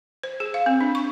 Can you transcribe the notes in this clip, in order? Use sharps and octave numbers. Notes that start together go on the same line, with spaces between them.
C5
G#4
F5
C4
D4
C#6